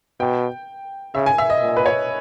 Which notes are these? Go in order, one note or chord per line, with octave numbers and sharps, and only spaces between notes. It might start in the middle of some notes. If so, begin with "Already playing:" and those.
B2 G5
C#3 E5
G#5
E5
D#5
A#2
B4
C#5